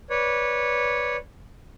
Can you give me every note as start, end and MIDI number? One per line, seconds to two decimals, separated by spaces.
0.10 1.17 71
0.10 1.17 73
0.10 1.17 74